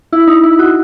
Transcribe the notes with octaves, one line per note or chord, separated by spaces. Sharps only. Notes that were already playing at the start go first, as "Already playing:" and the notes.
E4
D#4
E4
F#4